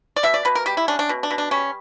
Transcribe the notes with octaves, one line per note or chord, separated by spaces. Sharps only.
D5
B2 E5
D5
B2 B4
A#4
G3 G4
E4
C#4 D4
D4
B2
D4
B2
D4
G3 C#4